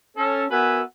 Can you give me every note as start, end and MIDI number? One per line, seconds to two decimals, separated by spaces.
0.17 0.45 61
0.17 0.45 69
0.51 0.82 59
0.51 0.82 66
0.51 0.82 70
0.51 0.82 71
0.51 0.82 76
0.51 0.82 80